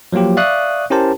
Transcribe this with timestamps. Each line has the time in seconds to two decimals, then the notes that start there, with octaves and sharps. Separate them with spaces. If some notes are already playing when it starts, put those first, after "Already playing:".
0.13 F3 F#3 A#3 F4 G4
0.37 D5 E5 F5 C#6 D#6 F#6
0.90 C#4 E4 G4 A#4 C5 A5